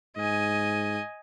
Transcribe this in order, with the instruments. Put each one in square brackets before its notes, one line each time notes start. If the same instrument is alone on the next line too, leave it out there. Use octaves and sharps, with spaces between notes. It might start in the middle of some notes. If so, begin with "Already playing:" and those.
[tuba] G#2 [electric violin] D#5 G#5